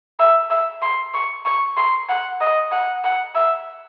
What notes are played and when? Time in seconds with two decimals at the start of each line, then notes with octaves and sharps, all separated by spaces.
0.20 E5
0.51 E5
0.82 C6
1.14 C#6
1.45 C#6
1.77 C6
2.09 F#5
2.41 D#5
2.72 F#5
3.04 F#5
3.35 E5